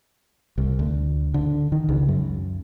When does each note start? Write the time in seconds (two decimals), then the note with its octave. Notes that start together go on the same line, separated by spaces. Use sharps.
0.58 C2
0.79 D2
1.34 D3
1.72 D#3
1.89 C#2
2.08 F#2